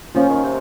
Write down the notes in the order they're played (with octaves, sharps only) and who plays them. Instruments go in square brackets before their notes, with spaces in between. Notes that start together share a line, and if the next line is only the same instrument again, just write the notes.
[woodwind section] F3 [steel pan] A#3 C#4 F4
[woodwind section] D#3
C3